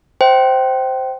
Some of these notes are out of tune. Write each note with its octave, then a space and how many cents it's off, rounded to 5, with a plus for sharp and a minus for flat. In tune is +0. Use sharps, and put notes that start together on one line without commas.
C5 +0 E5 +0 G5 -25